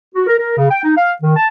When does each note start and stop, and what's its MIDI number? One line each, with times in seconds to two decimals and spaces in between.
0.15 0.23 66
0.27 0.35 70
0.38 0.55 70
0.57 0.69 49
0.70 0.83 79
0.84 0.95 63
0.97 1.12 77
1.23 1.33 51
1.36 1.47 81